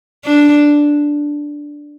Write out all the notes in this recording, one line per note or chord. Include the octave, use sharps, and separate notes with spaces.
D4